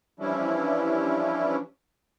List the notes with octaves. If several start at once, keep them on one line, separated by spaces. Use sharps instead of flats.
E3 F3 G3 C#4 D4 E4